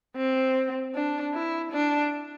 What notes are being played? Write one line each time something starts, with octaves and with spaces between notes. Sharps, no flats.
C4
D4
E4
D4